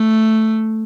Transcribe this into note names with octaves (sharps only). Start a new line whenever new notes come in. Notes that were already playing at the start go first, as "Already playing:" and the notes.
Already playing: A3